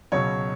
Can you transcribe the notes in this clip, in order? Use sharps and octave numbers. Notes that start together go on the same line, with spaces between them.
C#2 B2 F#3 C#5